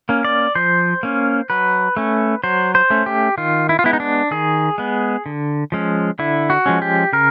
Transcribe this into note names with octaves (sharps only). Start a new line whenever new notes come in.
A#3 C#4
D5
F3 C5
A#3 C#4
F#3 B4
A3 C#4
F#3 C5
C5
A3 C#4
G4
D#3 F4
E4
F4
G#3 B3 E4
D#4
D4
D#3 G#4
G#3 B3
D3
F3 G#3 C#4
D3 E4
F#4
F3 G#3 C#4
G4
C#3 A#4